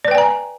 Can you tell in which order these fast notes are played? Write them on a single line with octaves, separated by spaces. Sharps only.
D5 B4 G5 G#5 A#5